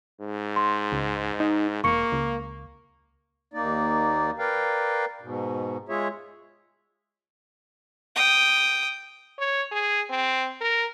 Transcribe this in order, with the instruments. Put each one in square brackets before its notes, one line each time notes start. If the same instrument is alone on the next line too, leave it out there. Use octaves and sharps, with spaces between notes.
[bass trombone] G#2
[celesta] C6
[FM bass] C#2
D#4
[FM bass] E1 [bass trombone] A#3 [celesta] C#6 C#7
[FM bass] C#2
[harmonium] D#2 A#3 D#4 D5
A#4 B4 D5 F5 G5
G#2 B2
G#3 F4 G#4 C#5 E5
[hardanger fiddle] G5 D#6
[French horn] C#5
G#4
C4
A#4